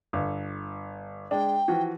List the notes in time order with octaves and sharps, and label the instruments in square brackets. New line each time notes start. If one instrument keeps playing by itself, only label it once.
[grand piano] G1
[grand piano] G#3 D4 [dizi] G5
[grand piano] E3 F3 F#4